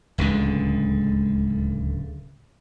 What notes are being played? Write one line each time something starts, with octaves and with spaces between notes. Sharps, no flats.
D1 C#2 D3 G#3